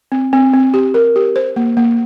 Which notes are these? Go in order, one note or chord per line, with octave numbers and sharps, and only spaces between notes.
C4
C4
C4
G4
A#4
G4
C5
A#3
A#3